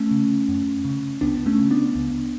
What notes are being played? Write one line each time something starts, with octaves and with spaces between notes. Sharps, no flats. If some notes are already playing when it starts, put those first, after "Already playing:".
Already playing: A3 C#4
C#3
F#2
C#3
C#2 B3 D4
A3 C#4
C#3
B3 D4
C#2